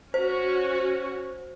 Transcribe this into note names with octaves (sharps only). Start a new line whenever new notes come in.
C#4 F#4 C5